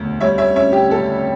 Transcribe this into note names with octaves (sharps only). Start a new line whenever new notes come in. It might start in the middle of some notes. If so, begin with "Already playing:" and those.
Already playing: E1 D2
G3 C#5 E5
C#5 E5
C#4 C#5 E5
G4
C#2 A4